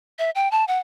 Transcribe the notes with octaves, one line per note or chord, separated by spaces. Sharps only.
E5
G5
A5
F#5